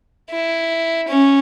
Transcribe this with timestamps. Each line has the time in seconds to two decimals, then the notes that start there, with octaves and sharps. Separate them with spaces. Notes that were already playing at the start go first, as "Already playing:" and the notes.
0.30 E4
1.08 C#4